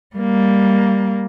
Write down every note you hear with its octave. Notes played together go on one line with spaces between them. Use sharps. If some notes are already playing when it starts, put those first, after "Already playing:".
G3 A#3